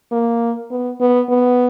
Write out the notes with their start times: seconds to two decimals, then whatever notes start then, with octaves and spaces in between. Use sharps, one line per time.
0.12 A#3
0.71 B3
1.01 B3
1.30 B3